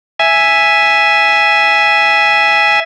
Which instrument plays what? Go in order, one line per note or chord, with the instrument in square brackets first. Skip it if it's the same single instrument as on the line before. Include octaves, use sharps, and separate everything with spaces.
[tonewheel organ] E5 G#5